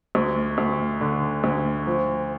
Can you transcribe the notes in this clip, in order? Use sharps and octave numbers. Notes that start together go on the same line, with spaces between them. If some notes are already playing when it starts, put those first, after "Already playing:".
D2
D2
D3
D2
F3